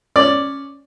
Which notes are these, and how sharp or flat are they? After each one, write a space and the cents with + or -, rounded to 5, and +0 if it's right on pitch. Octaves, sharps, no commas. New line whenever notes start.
C#4 +0 D5 +0